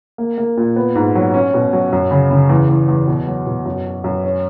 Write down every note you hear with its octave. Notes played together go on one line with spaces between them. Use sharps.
A#3
A#3
A#2
B3
G#2
F#3
C#4
B2
F#3
F#2
C#3
C#3
E2
E2
E2
B2
F#3
B2
F#2
F#4
F#2
C#4